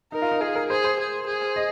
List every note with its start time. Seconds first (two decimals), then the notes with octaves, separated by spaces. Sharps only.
0.12 D#4 A#4
0.22 F4
0.31 D#4
0.41 F4 G#4
0.55 A#4
0.70 G#4 C5
0.84 C5
0.99 G#4
1.27 G#4
1.56 D#5